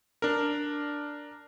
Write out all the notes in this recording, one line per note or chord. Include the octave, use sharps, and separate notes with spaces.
D4 A#4